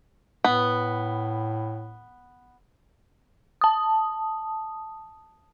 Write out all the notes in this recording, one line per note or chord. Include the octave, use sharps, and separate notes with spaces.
A2 B3
A5 D#6